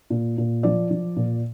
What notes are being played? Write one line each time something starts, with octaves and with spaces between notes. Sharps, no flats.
A#2
A#2
F3 D5
F3
A#2